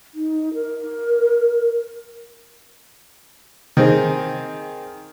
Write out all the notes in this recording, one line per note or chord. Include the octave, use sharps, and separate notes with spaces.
D#4
A#4
D#3 C4 G#4